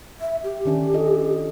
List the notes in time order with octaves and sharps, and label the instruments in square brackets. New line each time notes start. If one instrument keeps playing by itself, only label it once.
[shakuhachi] E5
G4
[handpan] D#3 C#4 D4
F4 A4 D#5